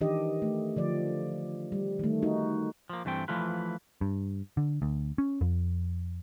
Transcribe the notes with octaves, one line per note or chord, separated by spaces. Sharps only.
D#3 E3 D4 G4 D#5
A3
D3 F3 D5
G3
D#3 A3
D#4 F#4
F3 A#3
G2 E3 A3 C4 G5
E3 F3 A3 F4 B4
G2
D3
D2
C#4
F2